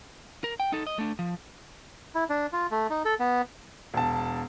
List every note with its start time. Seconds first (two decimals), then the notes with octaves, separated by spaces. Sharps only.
0.44 A#4
0.60 G5
0.73 D#4 A4
0.87 D#5
0.99 A3 D4
1.19 F3
2.15 E4
2.30 D4
2.53 F4
2.71 A3
2.90 D#4
3.05 A4
3.20 B3
3.94 E1 A5